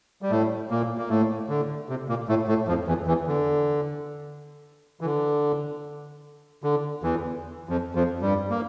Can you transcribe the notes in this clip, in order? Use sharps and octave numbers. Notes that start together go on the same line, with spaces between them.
G3
A2 A3
A#2 A#3
A#3
A2 A3
D3
C3
A#2 A#3
A2 A3
A2 A3
F2 F3
E2 E3
E2 E3
D3
E3
D3
D3
E2 E3
F2 F3
F2 F3
G2 G3
A#3